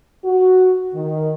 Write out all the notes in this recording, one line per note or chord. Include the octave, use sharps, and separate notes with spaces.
F#4
D#3